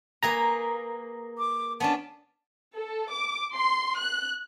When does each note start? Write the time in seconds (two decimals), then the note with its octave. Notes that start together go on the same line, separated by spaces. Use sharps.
0.23 A#3 G#4 B4 A#5
1.38 D6
1.80 B3 C#4 D4 A5
2.77 A4
3.12 D6
3.54 C6
3.98 F#6